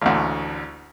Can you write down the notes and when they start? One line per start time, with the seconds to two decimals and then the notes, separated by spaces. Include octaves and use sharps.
0.02 A1 D2